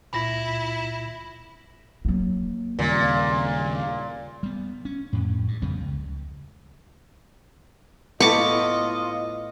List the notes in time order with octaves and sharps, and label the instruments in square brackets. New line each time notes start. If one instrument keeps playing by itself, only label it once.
[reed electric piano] C#2 A#2 F4 [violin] E4 [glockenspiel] B5 A#6
[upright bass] F#3 A#3
[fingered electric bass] D#2 C#3 G3 [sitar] A#2
[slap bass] G3 B3
C#4
F2 A2
G2
F2 C#3 G3 B3
C#2
[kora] A2 B3 [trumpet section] F4 D#5 [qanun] C#6 D6